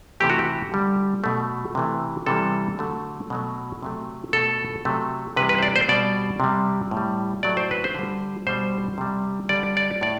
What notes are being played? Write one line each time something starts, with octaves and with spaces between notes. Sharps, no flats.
C3 E3 A3 G4
F#4
G4
D3 G3
B2 F#3 A3
C3 E3 A3
C3 E3 G3 A4
D3 F#3 A3
B2 F#3 A3
C3 F#3 A3
B2 A3 A4
C3 F#3 A3
C3 E3 G3 B4
B4
C5
D5
C5
B2 G3 D5
C3 G3
A2
G3
A2 F#3 A3 D5
C5
B4
C5
D3 G3
B2 G3 C5
C3 G3
D3 G3 D5
D5
A2 D5